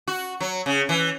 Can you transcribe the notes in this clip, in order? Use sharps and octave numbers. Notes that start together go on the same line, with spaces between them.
F#4
F#3
C#3
E3